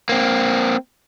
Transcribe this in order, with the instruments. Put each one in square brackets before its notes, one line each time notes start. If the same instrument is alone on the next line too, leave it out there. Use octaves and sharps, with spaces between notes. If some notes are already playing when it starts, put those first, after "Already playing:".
[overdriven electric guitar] A#3 C4